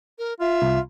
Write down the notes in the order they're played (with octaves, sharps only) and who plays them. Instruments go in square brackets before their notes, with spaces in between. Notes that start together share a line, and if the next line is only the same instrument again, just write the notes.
[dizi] A#4
[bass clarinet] F4 [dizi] E5
[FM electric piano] C2